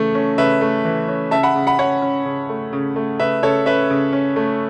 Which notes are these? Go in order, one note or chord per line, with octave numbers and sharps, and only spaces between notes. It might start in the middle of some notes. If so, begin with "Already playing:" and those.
Already playing: C#3 E3 A3 A4
C#4
C#3 B4 E5
A3
E3
C#4
C#3 E5 A5
F#5 B5
C#3
F#5 B5
C#4 C#5 F#5
C#4
C#3
A3
C#3
A3
C#3 B4 E5
C#3 A4 C#5
C#4 B4 E5
C#3
C#4
A3